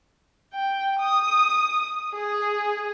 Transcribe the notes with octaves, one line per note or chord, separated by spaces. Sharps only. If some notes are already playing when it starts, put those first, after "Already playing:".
G5
D#6
G#4